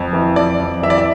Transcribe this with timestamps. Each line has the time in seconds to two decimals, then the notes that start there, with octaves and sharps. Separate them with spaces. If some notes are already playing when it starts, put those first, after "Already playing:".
Already playing: F2
0.13 E3
0.36 F2 D5
0.60 F2
0.83 E3 E5
0.90 D5
0.98 E5